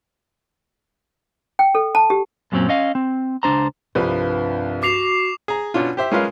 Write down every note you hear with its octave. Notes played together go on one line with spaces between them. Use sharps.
G5
A4
A5
G4
F#2 A#2 F#3 G3 C4 C#4
C#4 D#5 F5
C4
C#2 G#2 D4 C5 A#5
C2 G2 F3 B4
F#4 D6 C7 F7
G#4 A#5
B2 C#4 D4 F4
G4 C5 E5
G#3 C#4 F4 A#4 B4 F5